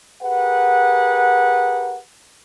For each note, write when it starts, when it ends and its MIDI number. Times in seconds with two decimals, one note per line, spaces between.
0.22 1.99 67
0.22 1.99 68
0.22 1.99 70
0.22 1.99 71
0.22 1.99 78